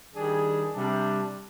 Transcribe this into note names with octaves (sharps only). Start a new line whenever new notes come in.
D#3 G3 D4 G#4
C3 G3 D4